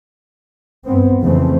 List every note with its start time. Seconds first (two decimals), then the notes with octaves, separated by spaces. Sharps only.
0.86 G2 B3 C4
1.22 F2 C#3 E3 F3 A3 C4